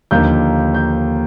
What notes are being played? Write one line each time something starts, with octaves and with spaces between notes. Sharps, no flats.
D#2 D3 F3 A#3 D#4 G6
G6